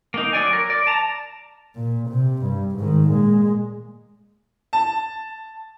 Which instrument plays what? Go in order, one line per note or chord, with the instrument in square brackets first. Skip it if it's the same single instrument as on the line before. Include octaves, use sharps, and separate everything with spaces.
[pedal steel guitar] A#3 D#4
F#3 D5 G#5
A#4
D5
A5 A#5
[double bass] A#2
C3
G2
G#2 D#3
A#2 G#3
[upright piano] A5